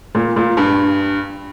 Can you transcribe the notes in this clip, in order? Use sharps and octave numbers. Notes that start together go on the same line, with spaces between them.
A#2
A#2
G2